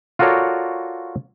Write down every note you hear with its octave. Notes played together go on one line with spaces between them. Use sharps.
F4 F#4 A4 A#4 C#5 D5